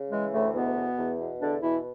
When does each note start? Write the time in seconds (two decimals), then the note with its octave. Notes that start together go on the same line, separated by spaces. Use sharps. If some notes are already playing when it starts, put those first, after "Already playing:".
Already playing: C#3
0.10 E3 G#3
0.33 D2 A2 A3
0.54 E2 B2 B3
0.76 B2
0.97 E2
1.20 B2
1.41 E2 D3 D4
1.62 B2 E3 E4